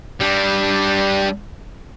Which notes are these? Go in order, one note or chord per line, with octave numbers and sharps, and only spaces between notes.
G3 D4